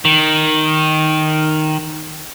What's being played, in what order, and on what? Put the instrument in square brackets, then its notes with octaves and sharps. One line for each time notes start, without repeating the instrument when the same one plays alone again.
[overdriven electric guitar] D#3